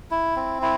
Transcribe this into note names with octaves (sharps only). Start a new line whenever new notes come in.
E4
C4
E4